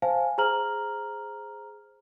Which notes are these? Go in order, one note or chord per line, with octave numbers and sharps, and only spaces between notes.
C5 F5 G#5 A5
G#4 C5 A#5 F6 F#7